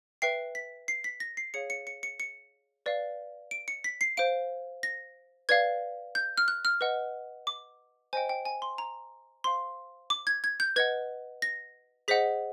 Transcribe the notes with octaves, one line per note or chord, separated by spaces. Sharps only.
B4 E5 G5 C7
B6
C7
B6
A#6
C7
G#4 C#5 F5 C#7
C#7
C#7
C#7
C#7
B4 D5 F5
D7
C#7
B6
C7
C5 F5 D7
A#6
B4 D5 F5 G#6
G6
F6
F#6
F6
B4 D#5 F#5
D6
C5 D#5 G5 G#5
G5
G#5
C6
A#5
C5 F5 C6
D6
G#6
G#6
G6
B4 D#5 F#5 G#6
A#6
G#4 C5 D#5 F#5 B6